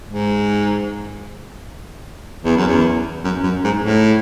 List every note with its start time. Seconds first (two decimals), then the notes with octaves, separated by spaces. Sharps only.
0.08 G#2
2.45 E2
2.56 F#2
2.67 E2
3.24 F#2
3.43 F#2
3.64 G#2
3.83 A2